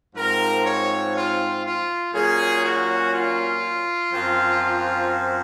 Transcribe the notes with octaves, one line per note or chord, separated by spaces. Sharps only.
G#2 F3 C4 A#4
C#5
F4
F4
A#2 F#3 C#4 G#4
F#4
F4
F#2 F3 C4
F4